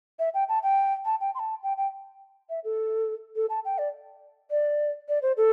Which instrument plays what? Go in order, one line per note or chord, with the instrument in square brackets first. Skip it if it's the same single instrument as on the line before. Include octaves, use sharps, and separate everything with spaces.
[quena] E5
G5
A5
G5
A5
G5
C6
A5
G5
G5
E5
A4
A4
A5
G5
D5
D5
D5
C5
A4